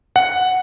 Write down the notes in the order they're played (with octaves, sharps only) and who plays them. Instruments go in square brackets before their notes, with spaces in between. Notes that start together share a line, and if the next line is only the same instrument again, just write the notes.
[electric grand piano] F#5